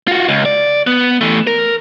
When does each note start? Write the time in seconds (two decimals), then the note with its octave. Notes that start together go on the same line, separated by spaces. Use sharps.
0.08 F4 F#4
0.28 C#2
0.46 D5
0.87 B3
1.21 E3 A3
1.47 A#4